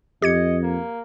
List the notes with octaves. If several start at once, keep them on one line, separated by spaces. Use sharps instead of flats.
F2 G4 D#5 G#6 C#7
A#3